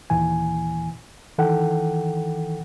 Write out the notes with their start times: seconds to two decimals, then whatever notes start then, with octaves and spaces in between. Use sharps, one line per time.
0.10 D#2 A#2 E3 G#5
1.38 D#3 E3 A4 F#5 G5